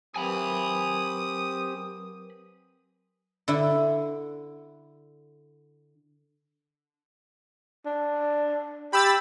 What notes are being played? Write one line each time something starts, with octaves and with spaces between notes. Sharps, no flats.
F#3 C4 G4 A#4 B4 G#5 B5 D#6
D3 E4
D4
G4 B5 E6 A6